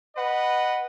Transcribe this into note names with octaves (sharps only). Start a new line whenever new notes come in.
B4 D#5 F#5